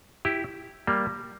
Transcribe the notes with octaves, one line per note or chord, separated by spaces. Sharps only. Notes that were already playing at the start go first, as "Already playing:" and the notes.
E4 G4
G3 A#3